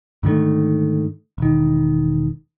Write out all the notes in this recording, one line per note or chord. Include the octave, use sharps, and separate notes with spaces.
G#2 D3 D#3 A3
E1 D#3